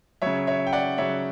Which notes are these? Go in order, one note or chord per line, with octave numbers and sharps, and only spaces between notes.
C#3 F#3 C#5 E5
C#5 E5
G5
D5 F#5
C#3 F#3 C#5 E5